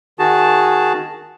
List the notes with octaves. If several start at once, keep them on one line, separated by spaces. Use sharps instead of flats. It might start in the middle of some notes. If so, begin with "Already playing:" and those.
D#3 F#4 G#4 A5